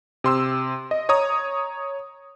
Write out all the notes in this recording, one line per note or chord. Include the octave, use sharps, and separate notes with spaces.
C3 C6 E6
D#5
C#5 A#5 D#6